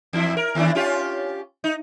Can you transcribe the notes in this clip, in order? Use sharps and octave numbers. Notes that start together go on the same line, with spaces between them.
E2 E4
A#4
D#2 E3 D4
C#4 F4 G4
D#4